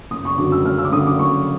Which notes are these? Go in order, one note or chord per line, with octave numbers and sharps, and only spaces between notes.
F#1 D#6
C#6
F#2 D3 F#3 D6
E6
F#1 F6
E6
D6
F#2 D3 F#3 D#6
D6
F#1 C#6